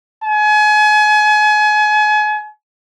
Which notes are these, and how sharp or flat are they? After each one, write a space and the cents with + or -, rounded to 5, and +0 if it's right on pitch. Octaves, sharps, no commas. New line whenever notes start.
G#5 +35